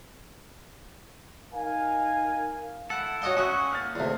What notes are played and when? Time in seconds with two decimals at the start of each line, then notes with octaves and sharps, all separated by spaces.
1.53 D#4 A#4 F5 G#5
2.90 E4 A4 F#5 B5
3.22 F#4 C#5 D#5 F5 G5
3.37 C#4 F#4 E5 F#5 G#5 C#6 D#6 F#6
3.72 A#3 F6 A6
3.95 E2 C3 A3 F4